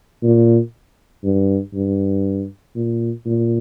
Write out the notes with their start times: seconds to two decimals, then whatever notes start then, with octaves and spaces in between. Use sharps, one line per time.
0.23 A#2
1.24 G2
1.74 G2
2.75 A#2
3.26 A#2